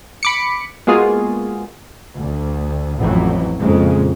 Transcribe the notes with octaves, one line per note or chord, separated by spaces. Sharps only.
B5 D6 C#7
G#3 A#3 B3 F4 F#4 G#4
D2
A1 F2 E3 F#3
F2 A#2 C#3 G#3